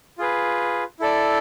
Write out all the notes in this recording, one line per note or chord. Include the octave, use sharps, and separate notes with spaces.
F4 G#4 B4
E4 A4 D5